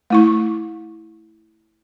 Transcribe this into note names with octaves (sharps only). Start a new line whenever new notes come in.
A3 E4 C#6